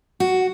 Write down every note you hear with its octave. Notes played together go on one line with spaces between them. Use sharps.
F#4